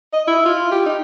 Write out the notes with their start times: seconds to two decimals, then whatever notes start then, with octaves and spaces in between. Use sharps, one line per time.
0.13 D#5
0.27 E4
0.45 F4
0.71 G4
0.86 D#4